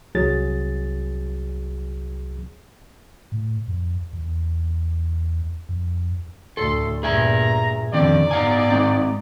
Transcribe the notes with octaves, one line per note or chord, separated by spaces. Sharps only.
C2 F#3 G#4 A6
A2
F2
E2
F2
D2 A2 A4 C6
G2 A#2 G#4 E5 G#5 A#5
F2 D3 D#3 F3 C4 D5
G#2 B3 D#4 F5 G#5
G#3 C4